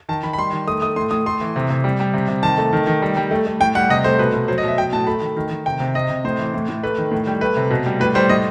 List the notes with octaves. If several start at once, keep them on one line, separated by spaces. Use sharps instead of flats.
D#3 A5
D#3 B5
B5
G3 C6
D#3
A3 D#6
A3 D#6
A2 C6
A2 D#6
A3 C6
E3
C3
C3
G3
G3
C3
C3
D#3 A5
A3
D#3
D#3
G3
G3
A3
A3
A2 G5
G3 F#5
C3 D#5
A3 C5
B2 B4
B2
F#3 C5
D#5
B2 E5
F#3 G5
A2 A5
A3 B5
D#3
D#3
D#3
C3 G5
C3
C3 D#5
C3
A2 C5
E3
A2
A2
A3 B4
D#3
A2
G3
A3 B4
C3
B2
G3
A2 B4
G3 C5
A2 D#5